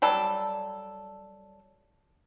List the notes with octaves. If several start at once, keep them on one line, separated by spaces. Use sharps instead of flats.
F#3 G3 A4